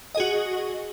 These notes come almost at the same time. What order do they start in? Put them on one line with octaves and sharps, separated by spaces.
D#5 G#4 F#4